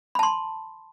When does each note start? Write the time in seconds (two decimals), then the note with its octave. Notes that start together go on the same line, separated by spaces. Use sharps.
0.15 B5
0.19 A5
0.23 C6